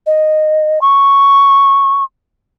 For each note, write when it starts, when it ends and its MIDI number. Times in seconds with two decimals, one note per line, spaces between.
0.07 0.79 75
0.81 2.04 85